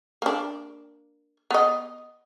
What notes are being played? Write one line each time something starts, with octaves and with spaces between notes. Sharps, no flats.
A#3 D4
B3 D#5